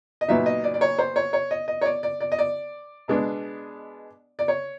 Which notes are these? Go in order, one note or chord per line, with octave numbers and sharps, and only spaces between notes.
D#5
A#2 F#3 B3 D#4 E5
D#5
D5
D5
C#5
C5
C#5
C#5
D#5
D#5
C#5
D5
D5
D5
D#5
D5
B2 G#3 B3 D4
D5
C#5